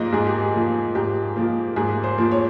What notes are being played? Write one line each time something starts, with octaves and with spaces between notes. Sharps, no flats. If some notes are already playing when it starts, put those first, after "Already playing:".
Already playing: G#2 F3 A#3 D#5
G#2 G#4
G4
G#4
F3 A#3
G#2 G4
F3 A#3
G#2 G#4
C5
F3 A#3
C#5